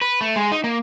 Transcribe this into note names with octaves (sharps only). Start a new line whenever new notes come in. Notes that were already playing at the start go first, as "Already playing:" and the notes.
B4
A3
G#3
D#4
A#3